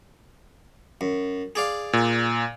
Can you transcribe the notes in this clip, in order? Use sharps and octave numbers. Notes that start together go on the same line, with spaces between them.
F#2
G#4 D5 F5
A#2